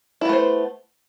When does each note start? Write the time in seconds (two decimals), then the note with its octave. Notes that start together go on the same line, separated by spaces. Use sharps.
0.21 E4
0.25 B3
0.29 A3
0.33 C5